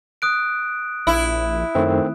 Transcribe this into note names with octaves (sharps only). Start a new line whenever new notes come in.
D#6 F#6 D7
A#1 E4
F#2 D#3 A3 C4